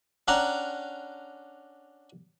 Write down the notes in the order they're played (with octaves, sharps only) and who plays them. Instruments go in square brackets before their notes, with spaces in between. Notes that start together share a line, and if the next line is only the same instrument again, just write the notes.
[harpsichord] C#4 D4 D5 F#5 G5 A#5